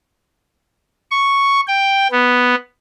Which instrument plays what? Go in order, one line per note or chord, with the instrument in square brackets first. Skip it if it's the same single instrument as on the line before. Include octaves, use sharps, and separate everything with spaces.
[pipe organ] C#6
G5
B3